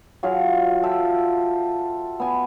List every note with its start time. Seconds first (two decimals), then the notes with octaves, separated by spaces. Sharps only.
0.23 F#3 F4 G#4 F5
0.83 F4 A4 E5 G5
2.20 B3 G#5